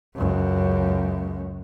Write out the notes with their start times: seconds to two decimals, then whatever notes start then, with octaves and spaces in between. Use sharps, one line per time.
0.15 C#2 F#2